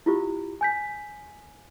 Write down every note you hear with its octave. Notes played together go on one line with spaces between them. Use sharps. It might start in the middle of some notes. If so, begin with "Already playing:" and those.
E4 F4 G4
G#5 G6 B6